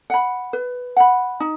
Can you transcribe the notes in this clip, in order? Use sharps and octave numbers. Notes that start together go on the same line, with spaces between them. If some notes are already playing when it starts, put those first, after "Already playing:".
F#5 B5
B4
F#5 B5
D#4